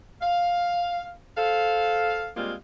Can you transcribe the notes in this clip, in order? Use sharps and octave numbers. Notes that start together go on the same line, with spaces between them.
F5
A4 C5 F5
G3 G#3 A#3 C4 F4